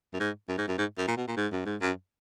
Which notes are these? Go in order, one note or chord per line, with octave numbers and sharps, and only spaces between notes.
F#2
G#2
F#2
G#2
F#2
G#2
F#2
A#2
B2
A#2
G#2
F#2
G#2
F#2